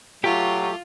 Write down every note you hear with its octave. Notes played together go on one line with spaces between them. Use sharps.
F#3 A3 F4 G4 A4 D6